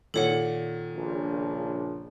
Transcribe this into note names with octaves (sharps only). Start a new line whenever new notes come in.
A#2 D#3 A4 C#5 F#5
A#1 C#3 D4